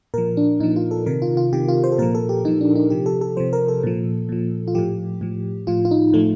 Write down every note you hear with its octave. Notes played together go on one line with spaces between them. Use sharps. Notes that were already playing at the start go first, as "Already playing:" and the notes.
A#2 F3 A#4
D4
A#2 F3 D#4
F4
A4
C3 D#3 A#4
F4
F4
C3 D#3 G4
F4
C5
A4
A#2 F3 A#4
A4
G4
A#2 F3 D#4
D4
D#4
C3 F3 G4
A4
A4
C3 F3 C5
A#4
A4
A#2 F3
A#2 F3
F4
A2 F3 G4
A2 F3
A2 F3 F4
F4
D#4
A2 F3 A3